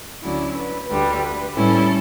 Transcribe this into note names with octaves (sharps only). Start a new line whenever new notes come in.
D2 D3 F#3 C#4 E4 D5
B4
D2 D3 G3 B4
A2 G3 C#4 E4 A4